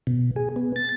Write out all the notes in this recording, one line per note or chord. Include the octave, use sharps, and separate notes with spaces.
B2
G#4
B3
A6